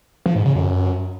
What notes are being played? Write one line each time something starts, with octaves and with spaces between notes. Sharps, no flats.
F3
G#2
C#3
F#2